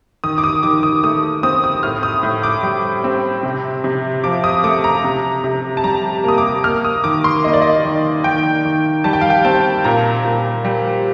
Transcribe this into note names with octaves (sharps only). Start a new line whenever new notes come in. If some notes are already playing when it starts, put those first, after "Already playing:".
D#3 D#6
D6
D#6
D#3 D6
D#6
A3 D#6
C4 D#6
D#6
A2 F6
D#6
A2
D6
G3
C4
C3
C3
F3 D6
D#6
A3 D6
A#5
C3
C3
A5
G3 A#5
A#3 D#6
D6
A#3 F6
D#6
D#3 D6
C6
A#3 D#5
D5
D#5
D#3
D#3 G5
D#3
G3 A5
G5
F5
G5
C4 A5
A#2 A#5
A#2
G3